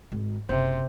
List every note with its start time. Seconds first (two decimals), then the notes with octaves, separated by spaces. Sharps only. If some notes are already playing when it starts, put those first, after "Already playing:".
0.12 G#1
0.49 F#1 C3 C5